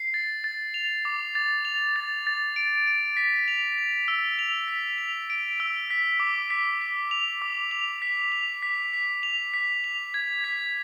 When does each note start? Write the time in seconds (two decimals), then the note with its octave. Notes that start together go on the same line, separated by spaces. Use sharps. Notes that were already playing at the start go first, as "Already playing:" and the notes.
Already playing: C7
0.14 A6
0.44 A6
0.74 F7
1.05 D6
1.35 A6
1.65 F7
1.96 A6
2.27 A6
2.56 D7
2.87 D7
3.17 B6
3.48 F7
3.78 F7
4.08 E6
4.39 F7
4.68 B6
4.98 F7
5.30 D7
5.60 E6
5.90 B6
6.20 D6
6.50 B6
6.81 B6
7.11 F7
7.42 D6
7.71 F7
8.02 B6
8.32 F7
8.62 B6
8.93 B6
9.23 F7
9.54 B6
9.84 F7
10.14 G#6
10.44 B6